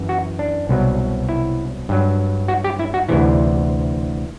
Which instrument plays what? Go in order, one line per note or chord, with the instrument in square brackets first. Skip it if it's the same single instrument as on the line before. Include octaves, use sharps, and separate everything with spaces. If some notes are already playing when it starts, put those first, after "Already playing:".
Already playing: [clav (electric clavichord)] F#2 E3
F#4
D4
C2 B2 F#3
E4
G2 F#3
F#4
G4
E4
F#4
D2 C3 E3 E4